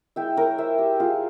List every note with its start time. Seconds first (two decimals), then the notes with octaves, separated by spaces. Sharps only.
0.16 G#3 E4 E5 G5
0.37 A#4 C#5
0.58 C5 E5
0.78 G4
1.00 F4 G#4